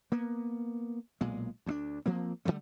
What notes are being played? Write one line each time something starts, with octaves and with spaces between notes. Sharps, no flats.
A#3 B3
B1 A#2 G#3
D2 A3 D4
F3 A#3 C4
D3 F3 G3 A3